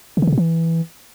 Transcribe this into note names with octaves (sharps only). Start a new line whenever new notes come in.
C#3
D#3
C#3
B2
E3